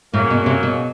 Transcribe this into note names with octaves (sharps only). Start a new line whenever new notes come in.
A2 C#3 F#3 A#3
B2
C3
B2